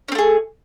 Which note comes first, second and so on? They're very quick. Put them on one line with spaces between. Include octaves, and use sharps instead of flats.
C#4 C4 A3 G#4